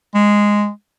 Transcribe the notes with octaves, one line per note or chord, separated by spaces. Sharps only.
G#3